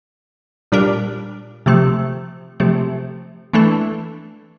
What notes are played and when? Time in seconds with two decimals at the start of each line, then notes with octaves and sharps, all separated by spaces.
0.72 A#2 G3 D4 G4 A#4
1.66 C3 F3 A3
2.60 C3 F3 A3
3.53 E3 A3 D4 A4